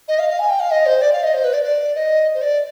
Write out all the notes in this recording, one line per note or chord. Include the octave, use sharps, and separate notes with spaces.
D#5
F5
F5
G#5
G5
F5
D#5
C5
D5
F5
D#5
C5
B4
D5
D5
D#5
C5
D5